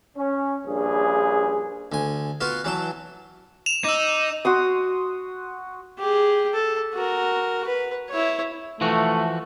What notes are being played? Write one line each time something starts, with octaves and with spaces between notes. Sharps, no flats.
C#4
A#1 G2 C#3 G#4
D2 G#5
B3 F4 F#4
E3 F#3 A5
E7 F7
D#4 D6 E6
F#4 C6 D#6
G4 G#4
A4
F#4 A#4
B4
E4 C#5
E3 F3 A3 F#4